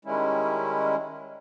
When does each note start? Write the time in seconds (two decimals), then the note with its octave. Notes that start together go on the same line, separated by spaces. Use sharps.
0.05 D#3 G3 G#3 C#4 E4